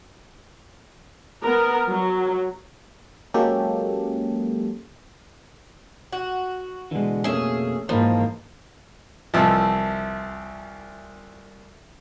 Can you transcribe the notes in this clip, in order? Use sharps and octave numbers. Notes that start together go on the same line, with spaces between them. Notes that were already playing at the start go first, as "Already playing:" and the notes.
B3 A#4
F#3
F#3 G#3 A#3 C#4 G4 A4
F#4
B2 D3 E3 G#3
F2 B2 A3 A#3 C#4 G#4 E5
G#2 E3 F3 A#3 D#4 F4 A5 B5
C2 E3 F3 E5 A5